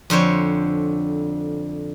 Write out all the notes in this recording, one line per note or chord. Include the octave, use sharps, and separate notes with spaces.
F2 D3 C5 C#5